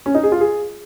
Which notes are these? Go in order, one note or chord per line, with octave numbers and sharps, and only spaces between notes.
C#4
D#4
G#4
F4
G#4